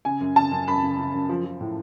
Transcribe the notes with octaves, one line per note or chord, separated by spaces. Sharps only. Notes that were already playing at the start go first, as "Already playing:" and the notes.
C#3 G#5
F#2
C#3 A5
F#2
F#2 B5
C#3
C#3
F#2
F3
F3
A2